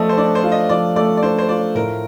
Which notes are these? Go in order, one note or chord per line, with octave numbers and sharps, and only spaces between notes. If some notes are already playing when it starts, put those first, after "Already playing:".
Already playing: F3 A3 D5 D#5
C5
D4 D5
C5
F4
D#5
F3 D5
A3 D5
D5
D4 C5
C5
F4 D5
A2 A#4